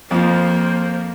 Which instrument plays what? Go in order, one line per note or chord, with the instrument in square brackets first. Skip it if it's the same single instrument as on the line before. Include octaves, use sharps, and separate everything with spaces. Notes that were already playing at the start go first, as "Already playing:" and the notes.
[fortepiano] F2 F3 [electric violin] A#3 [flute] C5